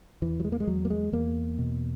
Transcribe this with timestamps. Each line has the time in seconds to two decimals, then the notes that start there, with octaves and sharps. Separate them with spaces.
0.22 E2 E3
0.40 F#3
0.44 G#3
0.52 A#3
0.60 G#3
0.67 E2 F#3
0.85 A#3
0.90 G#3
1.13 E2 A#3
1.58 B2